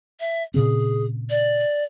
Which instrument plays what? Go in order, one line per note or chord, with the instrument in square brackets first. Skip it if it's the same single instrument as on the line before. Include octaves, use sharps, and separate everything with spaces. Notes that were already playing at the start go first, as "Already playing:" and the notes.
[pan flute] E5
[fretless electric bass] A#2 C#3 C4 [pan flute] G#4
[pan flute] D5